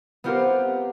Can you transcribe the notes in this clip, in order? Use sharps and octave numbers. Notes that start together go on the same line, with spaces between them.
B3 C4 F4 G4 A#4